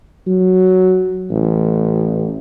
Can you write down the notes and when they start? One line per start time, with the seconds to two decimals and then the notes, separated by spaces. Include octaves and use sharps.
0.27 F#3
1.30 A1